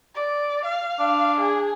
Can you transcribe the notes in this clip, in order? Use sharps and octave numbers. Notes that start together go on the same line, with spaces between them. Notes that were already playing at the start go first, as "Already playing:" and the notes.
D5
F5
D4
G#4